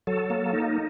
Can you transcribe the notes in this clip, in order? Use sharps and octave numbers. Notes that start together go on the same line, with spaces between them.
F#3 A4
A#3
D#4